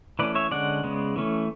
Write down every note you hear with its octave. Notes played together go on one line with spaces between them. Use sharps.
E3 A3 C#4 B4 D5
C#5 E5
D3 G#3 C#4 D5 F#5
C#3 G#3 B3
E3 A3 C#4